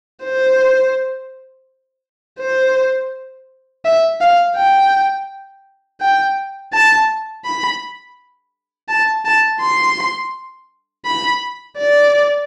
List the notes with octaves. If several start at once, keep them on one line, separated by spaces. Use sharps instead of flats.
C5
C5
E5
F5
G5
G5
A5
B5
A5
A5
C6
B5
D5